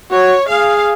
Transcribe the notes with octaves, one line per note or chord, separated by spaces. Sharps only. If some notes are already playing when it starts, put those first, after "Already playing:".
F#4 C#5
G#4 F5